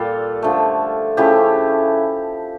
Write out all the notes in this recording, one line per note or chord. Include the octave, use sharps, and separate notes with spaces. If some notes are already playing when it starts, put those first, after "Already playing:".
Already playing: A#2 G3 F4 A4
D3 F3 A3
C#3 F3 A3 E4 G4